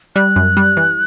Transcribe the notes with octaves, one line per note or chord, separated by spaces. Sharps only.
G3 F#6
F#2
G3
E3